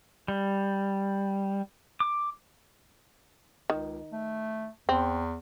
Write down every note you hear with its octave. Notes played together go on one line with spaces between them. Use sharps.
G3
D6
C#2 D#3
A3
E2 C4